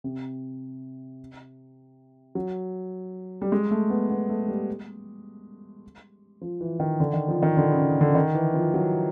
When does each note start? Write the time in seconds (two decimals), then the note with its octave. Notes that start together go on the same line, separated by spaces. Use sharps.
0.04 C3
2.35 F#3
3.42 G3
3.52 G#3
3.71 A3
3.90 B3
4.10 B3
4.29 A3
4.48 G3
6.41 F3
6.61 E3
6.80 D#3
7.00 D3
7.13 D#3
7.28 F3
7.43 D#3
7.57 D3
7.71 C#3
8.01 D3
8.15 D#3
8.35 E3
8.54 F3
8.74 F#3